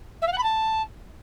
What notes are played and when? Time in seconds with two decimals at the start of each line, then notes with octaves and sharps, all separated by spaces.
0.22 E5
0.27 F5
0.33 F#5
0.38 B5
0.43 A5